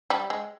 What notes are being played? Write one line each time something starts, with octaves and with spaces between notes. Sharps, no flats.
G3
G#3